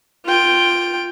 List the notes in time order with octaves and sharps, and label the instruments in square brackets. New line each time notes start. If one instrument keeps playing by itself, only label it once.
[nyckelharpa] F4 G5